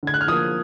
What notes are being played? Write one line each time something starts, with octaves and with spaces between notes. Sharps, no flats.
D3 G#6
F#6
F6
F3 A#3 D#6